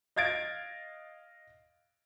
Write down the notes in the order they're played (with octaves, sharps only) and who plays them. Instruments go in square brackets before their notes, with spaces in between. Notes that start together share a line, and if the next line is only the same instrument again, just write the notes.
[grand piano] D#5 F5 G#6 A6 D7